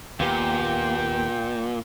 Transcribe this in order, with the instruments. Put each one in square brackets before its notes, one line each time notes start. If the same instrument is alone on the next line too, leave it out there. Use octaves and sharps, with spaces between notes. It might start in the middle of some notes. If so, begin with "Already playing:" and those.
[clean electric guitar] D#2 B3 G4 [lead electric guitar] A#2 [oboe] G5